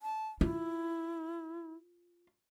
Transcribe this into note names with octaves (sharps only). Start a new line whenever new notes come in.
A5
E4 F4